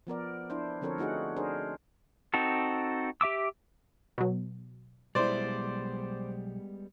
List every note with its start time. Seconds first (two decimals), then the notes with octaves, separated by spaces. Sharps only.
0.07 F3 B3 A#4 D5
0.50 D4 E4 C5
0.81 D3 F3 C4 A4 A#4 C#5
0.98 A3 D#4 F#4 G#4 F#5
1.36 D4 G#4 A#4 C5
2.34 C4 D#4 F#4 A4
3.21 G4 E5 D6 E6
4.18 B2 F#3
5.15 B1 G3 G#3 B3 E4 C5 D5